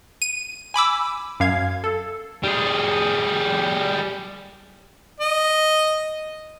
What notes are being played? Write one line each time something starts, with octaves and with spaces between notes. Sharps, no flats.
D#7
G#5 B5 D6 E6
F#2 F5 G#6
A4
G3 G#4
D#5